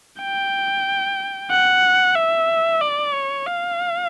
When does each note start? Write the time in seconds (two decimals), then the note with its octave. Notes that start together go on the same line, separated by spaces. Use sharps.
0.20 G5
1.51 F#5
2.15 E5
2.81 D5
3.13 C#5
3.47 F5